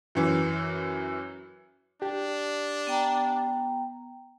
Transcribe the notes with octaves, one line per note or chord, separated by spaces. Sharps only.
F#2 E3
D4 G4
B3 G5 A#5